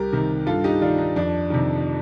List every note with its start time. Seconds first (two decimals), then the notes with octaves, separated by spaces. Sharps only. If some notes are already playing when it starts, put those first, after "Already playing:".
Already playing: C2 G4 A#4
0.12 C3 D#3
0.46 G2 F4 A4
0.64 D#4 G4
0.81 D#3 D4 F4
0.98 D#4
1.16 F2 D4
1.50 C3 D#3